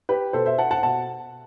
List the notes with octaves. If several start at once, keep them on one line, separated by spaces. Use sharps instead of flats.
G4 B4
B2 A4 C5
C5 E5
F#5 A5
F#5 A5
B2 F#5 A5